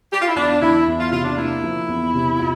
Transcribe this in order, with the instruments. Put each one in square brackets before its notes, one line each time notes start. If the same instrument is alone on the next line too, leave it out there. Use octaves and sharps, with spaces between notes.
[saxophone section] G4
F4
E4
[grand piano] E2 [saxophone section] D4
[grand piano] E3 [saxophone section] E4
[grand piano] E2
[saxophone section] F4
[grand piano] C3 [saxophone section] F4
[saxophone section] D4
[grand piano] A#3 [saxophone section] E4
[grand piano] F3
E2
C3
F4